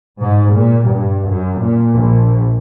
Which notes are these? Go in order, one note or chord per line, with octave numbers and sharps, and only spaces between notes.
G#2
A#2
G2
F#2
A#2
A#1